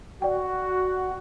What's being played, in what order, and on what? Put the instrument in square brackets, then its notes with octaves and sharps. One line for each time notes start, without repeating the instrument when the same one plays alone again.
[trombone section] F#4 [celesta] D5 G5